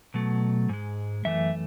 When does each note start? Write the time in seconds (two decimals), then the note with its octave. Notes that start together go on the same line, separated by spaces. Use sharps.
0.14 B2 F#3 A3
0.69 G#2 G#3
1.25 F#2 E3 A3 E5